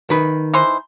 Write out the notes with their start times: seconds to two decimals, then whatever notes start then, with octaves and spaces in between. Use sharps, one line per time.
0.10 D#3 B4
0.54 E3 D#4 C5